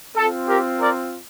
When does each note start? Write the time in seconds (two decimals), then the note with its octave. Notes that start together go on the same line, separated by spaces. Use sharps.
0.16 C4 F4 A4
0.48 G4 A#4
0.81 A#4 D5